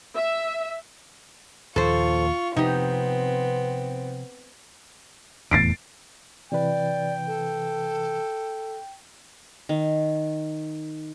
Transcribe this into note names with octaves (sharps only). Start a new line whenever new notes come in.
E5
D#2 A#2 F3 F4 A4 C5 C#6
C3 F3 B3 C4 D#4 G4
F1 E2 A2 A6 C7 D7
C3 E3 B4 D5 G5
A4
D#3